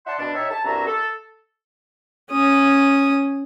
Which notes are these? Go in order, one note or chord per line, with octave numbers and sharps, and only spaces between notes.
D5 E5 F#5 A5 C6
B2 D4
D#4 G4 C#5 E5
A5
C2 G2 C4 F#4 E5 A#5
A4
C#4 D#6